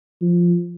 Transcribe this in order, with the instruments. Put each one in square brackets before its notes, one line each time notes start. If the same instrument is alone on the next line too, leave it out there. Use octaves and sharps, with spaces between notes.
[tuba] F3